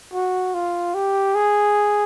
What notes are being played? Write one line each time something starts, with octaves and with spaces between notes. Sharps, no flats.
F#4
F4
G4
G#4